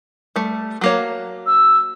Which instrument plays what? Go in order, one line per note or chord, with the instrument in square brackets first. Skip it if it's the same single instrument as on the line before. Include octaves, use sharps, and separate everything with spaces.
[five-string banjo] G3 A3
F#3 A#3 C#5
[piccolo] E6